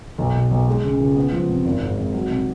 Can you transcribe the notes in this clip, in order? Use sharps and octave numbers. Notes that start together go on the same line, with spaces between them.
B1
B2
B1
G#3
C#3
C#2
B3
F3
C3
G#1
G#2
G#1
F#3
C3